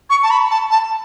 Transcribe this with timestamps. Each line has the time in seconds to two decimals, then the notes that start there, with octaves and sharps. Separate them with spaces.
0.10 C#6
0.23 A5
0.30 B5
0.51 A5
0.71 A5